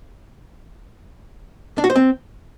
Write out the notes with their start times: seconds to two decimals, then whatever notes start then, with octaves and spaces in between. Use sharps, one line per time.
1.78 D4
1.84 F#4
1.90 C5
1.96 C4